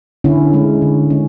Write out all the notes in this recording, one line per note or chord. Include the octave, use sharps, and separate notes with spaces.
D3 C#4 E4
G#3 C#4
D3
G#3 C#4